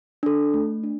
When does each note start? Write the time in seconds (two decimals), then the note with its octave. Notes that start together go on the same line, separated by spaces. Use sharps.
0.23 D4 A4
0.54 A3
0.83 D4